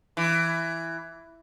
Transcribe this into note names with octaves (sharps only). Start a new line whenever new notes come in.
E3